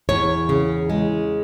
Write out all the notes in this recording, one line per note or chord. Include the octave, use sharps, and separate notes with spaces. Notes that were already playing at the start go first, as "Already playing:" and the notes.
E2 C#5
C#3
G#3